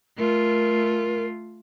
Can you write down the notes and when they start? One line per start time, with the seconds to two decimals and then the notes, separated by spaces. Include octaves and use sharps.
0.18 A3 F4 A#4